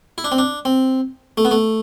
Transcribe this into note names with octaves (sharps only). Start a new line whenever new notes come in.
E4
D4
C4
D4
C4
A3
B3
A3